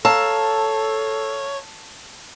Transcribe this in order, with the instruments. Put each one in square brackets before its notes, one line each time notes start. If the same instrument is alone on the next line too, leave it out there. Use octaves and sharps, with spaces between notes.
[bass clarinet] A4 [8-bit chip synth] C#5 [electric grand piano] F5 A#5 E6 [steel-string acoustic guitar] A5